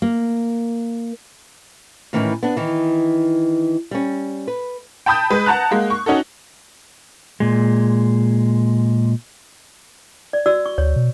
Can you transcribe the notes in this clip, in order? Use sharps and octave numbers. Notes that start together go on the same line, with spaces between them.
A#3
A2 D#3 E3 C#4 D#4
B3 D4
D#3 E3
G3 C#4
B4
G5 A5 B5 D#6 G6
G#3 B4
F#5 A5 A#5 F#6
G#3 A#3
C#6
C#4 D#4 F#4 A4
A#2 G#3
D5
F#4 D5 E6
C#6
D2 C#5
B2